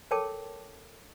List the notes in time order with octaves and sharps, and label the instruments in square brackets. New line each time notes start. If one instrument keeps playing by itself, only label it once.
[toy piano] A4 A#4 C#5 G5 A5 D6